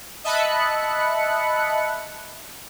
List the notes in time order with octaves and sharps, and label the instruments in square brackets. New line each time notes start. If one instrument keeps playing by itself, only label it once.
[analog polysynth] D#5 E5 A5 B5 F#6 C#7